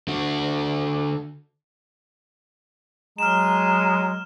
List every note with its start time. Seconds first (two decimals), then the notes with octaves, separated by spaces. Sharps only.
0.08 D3 F#4
3.18 F#3 G#3 A#5 F6 E7